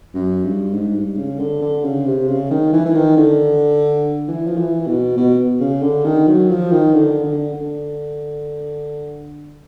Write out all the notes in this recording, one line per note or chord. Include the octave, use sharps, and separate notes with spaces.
F#2
G2
G#2
G2
C#3
D3
D3
C#3
C3
C#3
D#3
E3
E3
D#3
D3
E3
F3
E3
B2
B2
C#3
D3
D#3
F#3
F3
D#3
D3
D3
D3